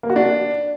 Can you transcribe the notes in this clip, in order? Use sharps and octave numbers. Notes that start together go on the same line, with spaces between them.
A#3
F#4
D4